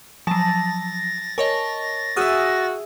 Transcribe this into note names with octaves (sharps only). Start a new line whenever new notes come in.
F3 F#3 A5 A6 A#6
A#4 C#5 D#5 A5 C#6
F#4 G#4 E5 D#6 F6 D#7